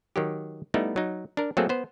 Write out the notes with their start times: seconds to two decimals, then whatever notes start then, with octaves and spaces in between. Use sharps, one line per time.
0.16 D#3 F#3 G4
0.74 G3 A3 B3 D#4 E4
0.96 F#3 D#4
1.37 D4 A#4
1.57 F#3 A3 A#3 C4 G#4 A4
1.69 B3 C5